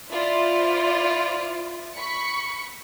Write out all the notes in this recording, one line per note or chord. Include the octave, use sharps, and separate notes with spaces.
E4 F4 C5 D5
B5 C#6 C#7